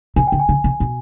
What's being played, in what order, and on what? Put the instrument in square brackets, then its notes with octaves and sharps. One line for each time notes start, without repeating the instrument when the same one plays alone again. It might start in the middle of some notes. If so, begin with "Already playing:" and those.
[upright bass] C3 [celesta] G#5
[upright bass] C#3 [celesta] G5
[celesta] G#5
[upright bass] C#3
C3
B2